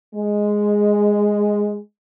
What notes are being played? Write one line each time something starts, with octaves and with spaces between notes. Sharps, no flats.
G#3